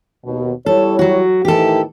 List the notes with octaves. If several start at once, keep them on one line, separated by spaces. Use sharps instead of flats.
D#2 B2
G3 E4 A4 C#5
F#3 F#4
A2 D#3 E3 G4 A4